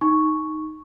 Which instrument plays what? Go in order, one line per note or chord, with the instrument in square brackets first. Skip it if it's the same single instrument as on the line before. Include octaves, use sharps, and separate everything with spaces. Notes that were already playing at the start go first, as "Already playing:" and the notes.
[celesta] D#4 C#6